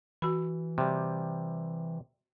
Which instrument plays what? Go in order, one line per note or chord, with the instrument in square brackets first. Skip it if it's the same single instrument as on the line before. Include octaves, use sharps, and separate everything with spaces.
[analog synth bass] E3 [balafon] F#4 B5
[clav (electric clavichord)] C3 G3